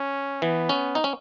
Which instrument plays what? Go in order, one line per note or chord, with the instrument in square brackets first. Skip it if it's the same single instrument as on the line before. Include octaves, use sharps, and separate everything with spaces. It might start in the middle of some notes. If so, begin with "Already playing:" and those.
Already playing: [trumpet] C#4
[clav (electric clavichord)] E3 [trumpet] B3
[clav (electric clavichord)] C#4
D#4
C#4